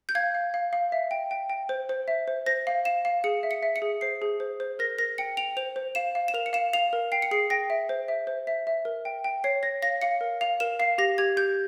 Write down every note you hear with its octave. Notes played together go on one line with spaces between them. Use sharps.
G6
F5 G#6
F5
F5
F5
E5
G5
G5
G5
C5
C5
E5
C5
C5 A#6
F5
F5 E7
F5
G#4 C#7
E5
C#7
E5
C#7
G#4
C5 C7
G#4
C5
C5
A#4 A#6
A#4 A#6
G5 C#7
G5 F7
C5 F7
C5
F5 E7
F5
E7
A#4 F7
C#7
F5 E7
F5 F7
A#4
G5 C7
C#7
G#4 C7
G5 A#6
E5
C5
E5
C5
E5
E5
A#4
G5
G5
C#5 C7
C#5 A#6
F5 A#6
F5 C#7
A#4
F5 F7
A#4 E7
F5 C7
G4 A#6
G4 G#6
G4 G6